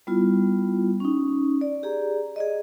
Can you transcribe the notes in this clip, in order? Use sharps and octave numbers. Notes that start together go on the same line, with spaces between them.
G3 B3 E4 F4
C#4 D#4
D5
G4 G#4 D5 A#5
G#4 D5 D#5